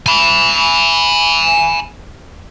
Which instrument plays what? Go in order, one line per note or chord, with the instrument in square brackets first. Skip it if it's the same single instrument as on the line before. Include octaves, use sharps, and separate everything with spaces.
[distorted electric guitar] G#5 B5